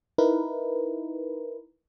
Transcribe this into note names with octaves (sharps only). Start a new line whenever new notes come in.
D#4 E4 A#4 B4